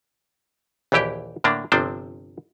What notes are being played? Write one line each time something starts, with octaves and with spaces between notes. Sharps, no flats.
A#1 D#2 E3 E4 G4 G5
A2 D3 A#3 D4
G1 C3 F3 C4 D4 C5